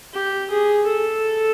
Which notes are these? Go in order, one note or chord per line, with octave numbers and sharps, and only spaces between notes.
G4
G#4
A4